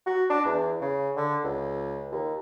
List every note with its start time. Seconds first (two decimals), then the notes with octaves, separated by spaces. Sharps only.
0.06 F#4
0.30 D4
0.45 E2
0.81 C#3
1.16 D3
1.44 C#2
2.11 D#2